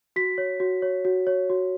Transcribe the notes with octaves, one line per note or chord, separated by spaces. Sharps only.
F#4 B6
C#5
F#4
C#5
F#4
C#5
F#4